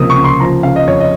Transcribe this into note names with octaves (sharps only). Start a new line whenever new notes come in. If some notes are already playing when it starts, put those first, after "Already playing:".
Already playing: C#2 C3 F3 A#3 D#6
C#6
C#2
C6
F3 A#5
C#3 F5
D#5
F2 C#5
D#5